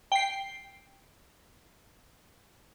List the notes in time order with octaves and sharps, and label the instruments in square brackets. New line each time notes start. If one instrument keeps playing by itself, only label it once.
[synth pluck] G5 C7